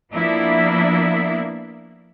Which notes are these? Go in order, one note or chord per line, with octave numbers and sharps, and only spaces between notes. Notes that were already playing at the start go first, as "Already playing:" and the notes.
F3 A#3 B3 D4 E4 E5